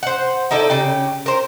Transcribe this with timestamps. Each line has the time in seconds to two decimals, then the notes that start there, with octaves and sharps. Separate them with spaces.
0.03 C5 F#5
0.51 D#4 E4 A4 D5
0.70 C#3 G4
1.26 A#4 C5